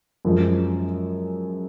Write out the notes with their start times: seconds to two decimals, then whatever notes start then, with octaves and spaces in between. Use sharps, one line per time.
0.25 F#2 F3 G#3